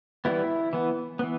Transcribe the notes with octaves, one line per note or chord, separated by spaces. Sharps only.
E3 G3 B3 E4
E3 B3
E3 B3